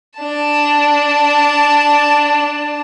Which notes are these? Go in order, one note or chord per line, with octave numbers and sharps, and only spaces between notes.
D4 A5